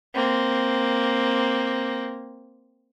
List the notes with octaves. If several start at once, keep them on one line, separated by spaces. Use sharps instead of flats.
A#3 C4